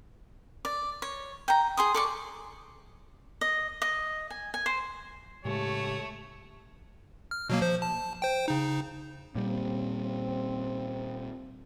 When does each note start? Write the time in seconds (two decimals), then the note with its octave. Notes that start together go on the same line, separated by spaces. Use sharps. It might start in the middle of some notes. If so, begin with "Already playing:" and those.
0.65 D5
1.02 C#5
1.48 G5 A#5
1.77 G#4 C6 D#6
1.94 A4 D5 C#6
3.41 D#5
3.82 D#5
4.30 G#5
4.54 G#5
4.66 C5
5.45 A2 C#3 G#3 A3 G4 C#5
7.31 F6
7.49 B2 F#3 A#3
7.62 F3 C5
7.82 A5
8.22 C5 G5
8.48 C#3 D#4
9.35 A#2 G3 C4